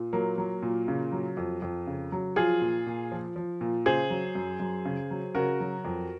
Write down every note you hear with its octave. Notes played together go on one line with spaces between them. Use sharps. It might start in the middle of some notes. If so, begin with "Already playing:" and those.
Already playing: A#2
F#3 A#3
F#3
A#2
C#3
F#3
F2
F2
C#3
F#3
F3 F4 G#4
A#2
A#2
F3
F3
A#2
C#3 G#4 C5
F#3
F#2
F#2
C#3
F#3
C#3 F#4 A#4
F#3
F2